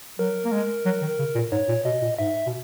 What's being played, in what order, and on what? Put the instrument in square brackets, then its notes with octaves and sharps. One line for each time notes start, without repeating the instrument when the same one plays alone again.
[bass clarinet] F#3 [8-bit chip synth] A#4
[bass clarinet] A#3
G#3
F#3
D#3
C#3
A#2
[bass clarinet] G#2 [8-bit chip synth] C#5
[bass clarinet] A#2
[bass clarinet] B2 [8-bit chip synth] D#5
[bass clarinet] A#2
[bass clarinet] G#2 [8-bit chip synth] E5
[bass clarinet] B2